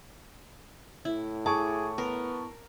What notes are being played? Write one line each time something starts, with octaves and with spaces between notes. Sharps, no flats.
A2 E4
G#4 A5 C#6 D6
B3 A#4